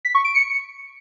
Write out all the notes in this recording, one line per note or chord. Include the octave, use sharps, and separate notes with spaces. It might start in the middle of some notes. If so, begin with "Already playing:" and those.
B6
C#6
D7
C#7